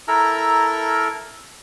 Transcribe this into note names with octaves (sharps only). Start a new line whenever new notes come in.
E4 A4 A#4 A#5